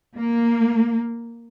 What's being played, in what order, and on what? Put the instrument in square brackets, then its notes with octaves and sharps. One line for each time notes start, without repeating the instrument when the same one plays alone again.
[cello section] A#3